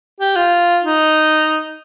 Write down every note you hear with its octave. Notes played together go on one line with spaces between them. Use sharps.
G4
F4
D#4